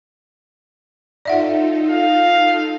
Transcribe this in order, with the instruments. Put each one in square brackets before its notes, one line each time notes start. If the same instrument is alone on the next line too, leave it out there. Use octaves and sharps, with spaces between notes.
[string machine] D#4 F4 A4 [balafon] D5 E5 F#5
[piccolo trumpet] F5